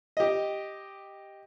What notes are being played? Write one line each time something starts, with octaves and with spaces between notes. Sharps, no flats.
G4 D#5